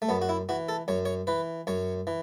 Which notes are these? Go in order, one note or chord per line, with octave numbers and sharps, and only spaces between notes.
A3
F#2 B3
F#4
E4
E3 F#4
A4
F#2 C#5
C#5
E3 B4
F#2 C#5
E3